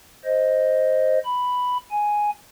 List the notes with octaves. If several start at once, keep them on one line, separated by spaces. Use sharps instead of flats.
C5 D#5
B5
G#5